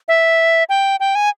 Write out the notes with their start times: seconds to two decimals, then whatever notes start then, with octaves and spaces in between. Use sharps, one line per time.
0.08 E5
0.69 G5
1.00 G5
1.15 G#5